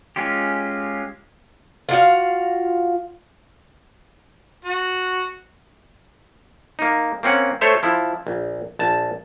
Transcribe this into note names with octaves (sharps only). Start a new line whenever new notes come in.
G#3 C#4 F4 G4
F4 F#4 F5
F#4
A#3 D#4
A#3 C4 C#4 F#5
A3 A4 C5 C#5 E5
F3 E4
A#1
A#1 A5